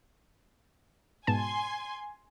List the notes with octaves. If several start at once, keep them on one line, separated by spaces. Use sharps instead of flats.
G#2 B2 G#5 A5 C6